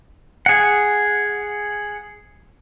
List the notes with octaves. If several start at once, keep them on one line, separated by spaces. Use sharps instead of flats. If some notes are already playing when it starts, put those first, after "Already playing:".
G#4 F#5